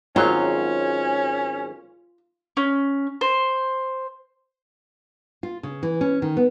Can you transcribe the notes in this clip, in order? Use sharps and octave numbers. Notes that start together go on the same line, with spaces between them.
G#1 F#3 C#4 F4
C#4
C5
F4
C#3
E3
C#4
D#3
B3